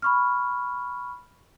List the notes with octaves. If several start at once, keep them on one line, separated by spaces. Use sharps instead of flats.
B5 C#6 F6